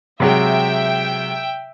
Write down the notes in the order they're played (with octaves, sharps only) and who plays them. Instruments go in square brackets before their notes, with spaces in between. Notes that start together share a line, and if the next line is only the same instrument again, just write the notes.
[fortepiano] C3 F#3 G#3 [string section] E5 G5